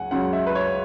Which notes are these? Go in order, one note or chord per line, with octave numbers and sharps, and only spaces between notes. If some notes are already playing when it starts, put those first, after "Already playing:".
Already playing: C#2 F#3 F#5 G#5
C#2 C#3 F#3 F#5
E5
B4
C#5